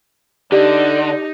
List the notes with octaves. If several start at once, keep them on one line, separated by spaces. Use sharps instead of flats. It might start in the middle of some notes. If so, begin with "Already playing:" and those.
D3 D#4 G4 D5